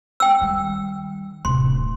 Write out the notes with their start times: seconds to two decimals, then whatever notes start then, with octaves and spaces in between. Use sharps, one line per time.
0.20 G5 E6
0.41 D#3 G3
1.45 D1 C3 C6